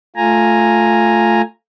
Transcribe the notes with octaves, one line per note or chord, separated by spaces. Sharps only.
A3 F4 G#5 A#5